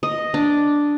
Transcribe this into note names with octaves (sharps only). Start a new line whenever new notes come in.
D#5
D4